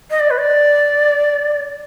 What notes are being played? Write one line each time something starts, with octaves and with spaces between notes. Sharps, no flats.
D#5
D5
B4
D5